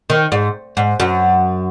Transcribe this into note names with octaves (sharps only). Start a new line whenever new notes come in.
D#3
G#2
G#2
F#2